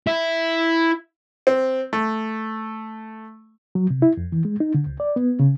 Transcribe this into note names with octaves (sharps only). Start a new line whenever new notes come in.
E4 E5
C4
A3
F#3
C3
E4
F2
E3
G#3
D#4
D3
C#2
D5
B3
C#3